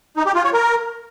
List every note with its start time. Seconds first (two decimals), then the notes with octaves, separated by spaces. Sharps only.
0.17 D#4
0.26 G4
0.35 F4
0.44 C#5
0.53 A#4